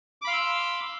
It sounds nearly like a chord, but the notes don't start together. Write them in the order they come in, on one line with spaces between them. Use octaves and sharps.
D6 B5 F5 C6 E6